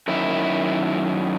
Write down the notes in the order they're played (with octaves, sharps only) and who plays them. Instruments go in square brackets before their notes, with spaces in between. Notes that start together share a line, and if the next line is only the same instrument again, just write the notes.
[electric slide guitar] F#2 D#3 E4